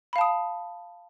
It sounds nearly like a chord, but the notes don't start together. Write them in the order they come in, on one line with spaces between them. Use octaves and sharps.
B5 F5 A5 D#6